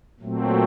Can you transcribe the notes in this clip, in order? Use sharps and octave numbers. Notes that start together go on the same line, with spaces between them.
A#2 F#3 A3 C4